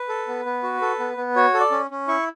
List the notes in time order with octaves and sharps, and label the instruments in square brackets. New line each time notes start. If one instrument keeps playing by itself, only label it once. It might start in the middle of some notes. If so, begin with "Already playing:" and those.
Already playing: [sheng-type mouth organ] B4
A4
B3
B3
F#4
A4
B3
B3
F#4 C#5
A4
D5
C#4
C#4
E4 C#6